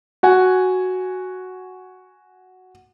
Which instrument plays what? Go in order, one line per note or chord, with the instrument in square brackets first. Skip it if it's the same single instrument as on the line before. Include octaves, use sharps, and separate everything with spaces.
[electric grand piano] F#4 F#5 G#5